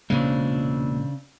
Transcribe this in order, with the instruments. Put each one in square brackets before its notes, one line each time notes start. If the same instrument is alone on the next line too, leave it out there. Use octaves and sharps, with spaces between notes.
[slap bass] E1 A#2 G#3 [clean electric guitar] C#3 C4 D4